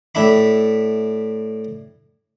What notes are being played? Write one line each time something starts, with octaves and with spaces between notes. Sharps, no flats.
A2 D4 E5 B5